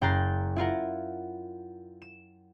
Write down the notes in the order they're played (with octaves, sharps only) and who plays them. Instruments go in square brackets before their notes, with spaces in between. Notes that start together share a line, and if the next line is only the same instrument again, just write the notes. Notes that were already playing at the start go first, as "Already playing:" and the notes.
[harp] F#1 G5 A#5 F#6 A6 C7
E4 F4 A#4 F#5
E7